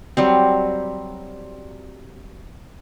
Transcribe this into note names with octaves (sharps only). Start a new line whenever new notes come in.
F#3 G3 C4